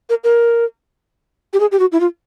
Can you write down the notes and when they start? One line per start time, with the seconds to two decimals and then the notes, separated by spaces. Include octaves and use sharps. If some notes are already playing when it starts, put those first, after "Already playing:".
0.10 A#4
0.24 A#4
1.53 G4
1.60 G#4
1.72 G4
1.79 F#4
1.92 E4
2.00 F4